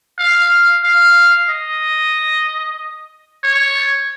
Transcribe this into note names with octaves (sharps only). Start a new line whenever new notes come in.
F5
F5
D#5
C#5